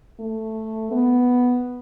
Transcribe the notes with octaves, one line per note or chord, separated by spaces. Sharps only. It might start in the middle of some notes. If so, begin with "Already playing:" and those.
A3
B3